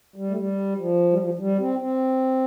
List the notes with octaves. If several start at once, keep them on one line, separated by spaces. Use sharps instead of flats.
G3
A3
G3
F3
G3
F3
F3
G3
C4
C4